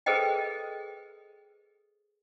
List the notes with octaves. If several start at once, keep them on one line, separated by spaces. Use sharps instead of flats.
G#4 A4 B4 C5 D#5 G5